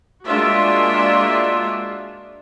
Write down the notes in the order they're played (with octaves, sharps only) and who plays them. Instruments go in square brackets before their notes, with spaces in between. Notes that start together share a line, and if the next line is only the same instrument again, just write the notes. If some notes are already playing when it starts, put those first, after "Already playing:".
[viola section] G#3 A#3 D4 F4 F#4 E5